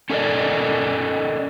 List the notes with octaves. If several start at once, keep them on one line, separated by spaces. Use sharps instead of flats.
C#4 A4 A#4 D5 D#5